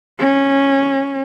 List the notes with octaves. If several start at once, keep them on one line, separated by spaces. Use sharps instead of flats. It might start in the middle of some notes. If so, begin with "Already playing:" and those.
C#4